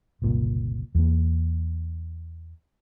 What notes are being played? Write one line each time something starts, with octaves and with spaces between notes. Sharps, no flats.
F#1 C2 A#2
E2 A#3